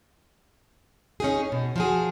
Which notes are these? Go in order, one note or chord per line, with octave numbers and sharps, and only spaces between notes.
C#4 D#4 G#4
B2
F3 F#4 G#4